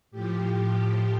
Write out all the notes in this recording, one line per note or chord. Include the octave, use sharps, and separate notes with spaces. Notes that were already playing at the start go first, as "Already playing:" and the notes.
A2 F3 G4